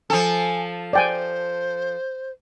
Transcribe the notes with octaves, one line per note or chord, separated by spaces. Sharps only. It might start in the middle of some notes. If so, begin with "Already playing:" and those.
F3 A4 G#5
C5 D5 G5 G#5